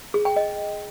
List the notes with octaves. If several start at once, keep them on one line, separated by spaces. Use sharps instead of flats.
G#4
G5
D#5